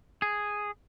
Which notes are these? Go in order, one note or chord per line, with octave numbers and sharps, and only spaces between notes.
G#4